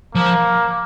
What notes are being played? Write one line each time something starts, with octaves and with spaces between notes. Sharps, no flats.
F3 A#3